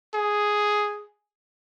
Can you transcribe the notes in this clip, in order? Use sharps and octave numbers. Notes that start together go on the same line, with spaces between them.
G#4